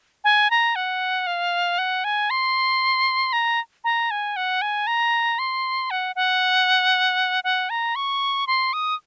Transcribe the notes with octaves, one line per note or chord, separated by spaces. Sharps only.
G#5
A#5
F#5
F5
F#5
G#5
C6
A#5
A#5
G#5
F#5
G#5
A#5
C6
F#5
F#5
F#5
A#5
C#6
C6
D#6